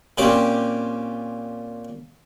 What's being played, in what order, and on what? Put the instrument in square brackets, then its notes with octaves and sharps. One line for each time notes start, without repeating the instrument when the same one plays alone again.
[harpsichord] A#2 C4 C#4 G4 C5 D6